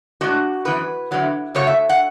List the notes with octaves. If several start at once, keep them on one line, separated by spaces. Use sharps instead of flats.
A2 G#3 D4 F#4
F#2 E3 B3 B4
E2 D3 F#3 B3
F#2 C#3 F#3 A3 C#5
E5
F#5